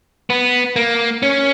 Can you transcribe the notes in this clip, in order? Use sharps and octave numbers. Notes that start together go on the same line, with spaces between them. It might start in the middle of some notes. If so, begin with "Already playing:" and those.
B3
A#3
C#4